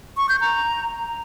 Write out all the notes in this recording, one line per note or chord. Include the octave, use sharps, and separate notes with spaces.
C#6
G6
A#5